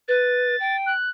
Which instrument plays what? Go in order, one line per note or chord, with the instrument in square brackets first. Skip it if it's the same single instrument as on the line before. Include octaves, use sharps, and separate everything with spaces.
[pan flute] B4 [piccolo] A6
[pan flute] G5
[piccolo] F#6